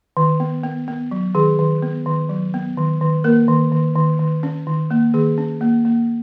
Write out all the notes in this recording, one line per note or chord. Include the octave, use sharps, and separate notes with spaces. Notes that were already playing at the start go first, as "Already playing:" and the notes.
D#3
B3
B3
B3
F#3
D#3 G#4
D#3
B3
D#3
F#3
B3
D#3
D#3
A#3 A#4
D#3
D#3
D#3
D#3
C#4
D#3
A#3
D#3 G#4
C#4
A#3
A#3